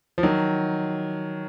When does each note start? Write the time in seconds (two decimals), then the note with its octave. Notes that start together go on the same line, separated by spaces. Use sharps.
0.18 F3
0.23 D#3 F#3